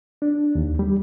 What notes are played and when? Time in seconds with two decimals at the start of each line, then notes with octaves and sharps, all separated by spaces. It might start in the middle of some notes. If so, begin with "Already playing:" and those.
0.22 D4
0.55 D#2
0.79 G3